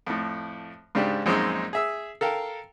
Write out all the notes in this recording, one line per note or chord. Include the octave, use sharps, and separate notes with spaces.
F2 A2
G#2 C#3 D4 G4
A#1 F#2 G#3 C4 C#4 D#4
G#4 E5 E6
A4 A#4 F5 G5